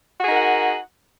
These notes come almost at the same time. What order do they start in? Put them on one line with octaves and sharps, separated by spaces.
F#4 G#4 D#4 A#4 F#5